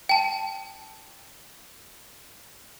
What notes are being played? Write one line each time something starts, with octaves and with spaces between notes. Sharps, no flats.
G5 A5